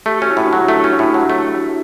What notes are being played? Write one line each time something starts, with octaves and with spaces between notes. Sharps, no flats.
A3 G4
C#4 F#4
E4
A2
D4 F#4
F#3
A3
C#4
A2
F#3
A3